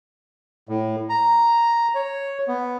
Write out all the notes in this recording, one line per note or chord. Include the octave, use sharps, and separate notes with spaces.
A2
A#5
C#5
B3